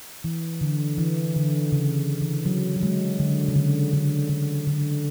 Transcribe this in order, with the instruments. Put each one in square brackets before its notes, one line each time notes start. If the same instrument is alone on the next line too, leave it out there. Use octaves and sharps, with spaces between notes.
[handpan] E3
D3
E3
D3
C#3
E3
F#3
F#3
G#3
D3
C#3
D3
D3
D3
D3